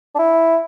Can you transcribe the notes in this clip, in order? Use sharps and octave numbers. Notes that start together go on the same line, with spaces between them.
D4
E4